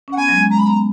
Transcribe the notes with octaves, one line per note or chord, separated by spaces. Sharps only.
C#4
F#5
B3 G#5
F#3
G#3
G#3 A#5
B5
B3 A#5